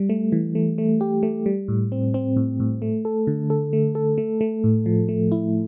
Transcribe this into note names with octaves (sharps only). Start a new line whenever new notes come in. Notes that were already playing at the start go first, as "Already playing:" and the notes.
Already playing: G3
A3
E3
A3
A3
G4
A3
G3
A2
C4
C4
A2
A2
A3
A4
D3
A4
A3
A4
A3
A3
A2
F3
A3
E4